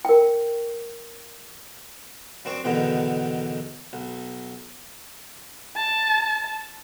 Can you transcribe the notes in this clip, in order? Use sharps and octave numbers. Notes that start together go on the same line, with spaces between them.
A#4 G5
F#2 C4 D4 C#6
B1 E2 B2 D3 D#3
B1
A5